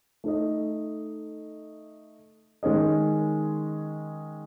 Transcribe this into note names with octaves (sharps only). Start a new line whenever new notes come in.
A3 D#4 A4 D#5
D#3 G#3 C#4 G#4 D#5